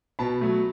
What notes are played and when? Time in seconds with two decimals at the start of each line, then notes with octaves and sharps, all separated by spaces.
0.19 B2 A5 B5
0.41 F#3 A3